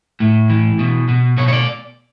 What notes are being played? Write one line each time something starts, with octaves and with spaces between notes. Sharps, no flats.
A2
E3
B2
B2
B2 C#5
C#5
D5